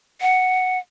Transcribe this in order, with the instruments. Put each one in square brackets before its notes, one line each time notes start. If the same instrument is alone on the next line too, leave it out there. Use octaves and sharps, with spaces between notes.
[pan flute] F#5